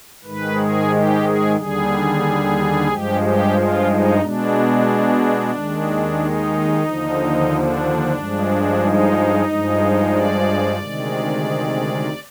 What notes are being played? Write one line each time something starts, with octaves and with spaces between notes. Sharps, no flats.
G#2 D#3 G#3 B4
G#4
G4
G#4
D#2 D3 G3 G#4
G2 F3 G#3 G4
G4
F4
D#4
B2 G#3 D4
D#2 D#3 G#3
D#4
D#2 D3 F3
D4
G2 F3 G#3
D#4
G2 F3 G#3
D5
D2 C3 D#3 G#3